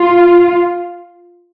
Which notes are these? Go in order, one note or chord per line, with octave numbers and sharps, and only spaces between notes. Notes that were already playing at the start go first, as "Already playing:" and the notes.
Already playing: F4